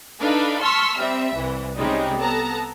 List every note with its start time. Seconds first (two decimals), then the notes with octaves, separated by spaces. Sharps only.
0.20 D4 D#4 A4 B4 F5
0.61 A5 C6 C#6 E6 F6 B6
0.98 G3 C4 E5
1.36 C2 E3
1.77 C3 G3 G#3 C#4 D#4
2.18 B3 A4 A5 A#5